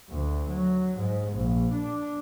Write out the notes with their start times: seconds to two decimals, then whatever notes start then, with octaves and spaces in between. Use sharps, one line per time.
0.10 D2
0.48 F#3
0.97 G#2
1.32 A#1
1.72 D4